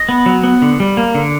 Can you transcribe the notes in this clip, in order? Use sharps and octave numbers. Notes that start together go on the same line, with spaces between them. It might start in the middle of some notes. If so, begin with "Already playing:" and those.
Already playing: D#5
B3
F#3
B3
D3
G3
A#3
D3